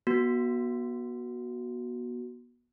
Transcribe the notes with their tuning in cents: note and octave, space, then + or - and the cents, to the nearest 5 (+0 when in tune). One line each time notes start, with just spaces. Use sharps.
B3 -35 F#4 +0